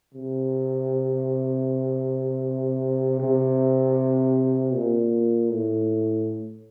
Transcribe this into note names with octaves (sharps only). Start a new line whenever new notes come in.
C3
C3
A#2
A2